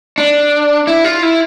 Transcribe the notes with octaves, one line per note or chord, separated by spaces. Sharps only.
D4
E4
F4
E4